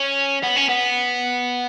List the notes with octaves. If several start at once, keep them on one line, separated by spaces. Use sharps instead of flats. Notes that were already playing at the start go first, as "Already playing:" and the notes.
Already playing: C#4
B3
C#4
B3